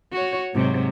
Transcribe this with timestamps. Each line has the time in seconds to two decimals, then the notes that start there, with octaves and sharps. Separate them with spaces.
0.13 F#4 C#5
0.54 G#2 C3 F#3